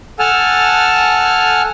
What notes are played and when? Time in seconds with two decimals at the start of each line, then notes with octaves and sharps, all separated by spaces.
0.19 A4 F#5 G#5 A5 F6